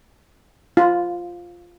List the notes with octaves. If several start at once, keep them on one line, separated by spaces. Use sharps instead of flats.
F4